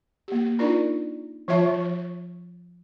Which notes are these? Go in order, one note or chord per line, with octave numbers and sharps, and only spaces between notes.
A#3 G4
D4 D#4 F4 A#4 D5
F3 F4 C#5 E5 A5
F3